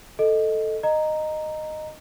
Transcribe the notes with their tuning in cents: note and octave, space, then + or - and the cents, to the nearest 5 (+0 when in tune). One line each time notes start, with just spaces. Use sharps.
A4 +0 D#5 +0
D#5 -10 A#5 -5